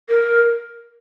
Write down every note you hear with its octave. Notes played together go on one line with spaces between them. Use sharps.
A#4